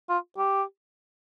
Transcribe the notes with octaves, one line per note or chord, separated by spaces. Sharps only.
F4
G4